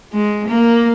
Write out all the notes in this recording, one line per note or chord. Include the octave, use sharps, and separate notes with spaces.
G#3
A#3